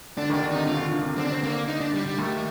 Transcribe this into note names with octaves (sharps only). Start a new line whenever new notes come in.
D3 D4
D#2 D#3 D4
D3
C3 D#4
C3 F4
D3
D3
C3
D3 C4
D4
C4
A#3
D#4
D4
G3
G3
D#2 D#3 A3